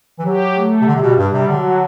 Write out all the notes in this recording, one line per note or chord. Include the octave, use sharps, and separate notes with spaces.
E3
F#3 G4
A3
C3
D3 G3
C3
B2
G2 G3
C3
D3 F#3